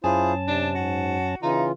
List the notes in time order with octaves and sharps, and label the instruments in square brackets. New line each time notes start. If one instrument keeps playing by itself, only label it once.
[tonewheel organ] F#2 C#4 A5 [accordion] E4 F4 C5 [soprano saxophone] G#4
[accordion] C3 [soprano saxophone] D4
[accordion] G#2 [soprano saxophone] F#4
[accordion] C#3 E3 F4 [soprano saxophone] D#4